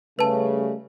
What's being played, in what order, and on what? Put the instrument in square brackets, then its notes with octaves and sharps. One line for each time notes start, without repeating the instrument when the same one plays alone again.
[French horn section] C#3 G3 [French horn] A3 [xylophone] B4 A5